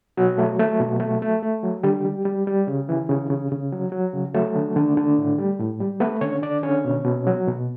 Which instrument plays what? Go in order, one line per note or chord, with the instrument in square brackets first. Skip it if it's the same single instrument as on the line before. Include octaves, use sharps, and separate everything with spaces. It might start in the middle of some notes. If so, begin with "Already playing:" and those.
[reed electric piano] B2 F#3 F#4
A3
A3
B2
A3
A3
A3
F#3
D3 G3 G4
G3
G3
G3
C#3
E3
C#3
C#3
C#3
F#3
F#3
C#3
F#3 A3 A4
D3
D3
D3
A2
G3
A2
G3
A3 B3 B4
D3 C#4 C#5
D3 D4 D5
D3 C#4 C#5
B2
B2
F#3
B2